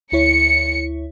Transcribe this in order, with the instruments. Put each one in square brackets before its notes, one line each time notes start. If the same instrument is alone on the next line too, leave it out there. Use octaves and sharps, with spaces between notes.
[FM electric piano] D2 E4 C#5 [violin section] C#7